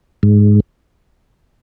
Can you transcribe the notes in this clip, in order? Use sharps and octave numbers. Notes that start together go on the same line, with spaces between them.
G#2